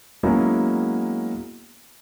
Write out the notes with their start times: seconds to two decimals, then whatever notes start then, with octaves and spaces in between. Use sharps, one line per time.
0.23 F#3 G#3 A#3 B3 C#4 E4